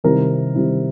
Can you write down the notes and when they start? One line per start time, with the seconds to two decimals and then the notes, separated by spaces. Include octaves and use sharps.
0.04 C3 D#3 G3 C4 E4 A#4
0.55 C3 D#3 G3 C4 E4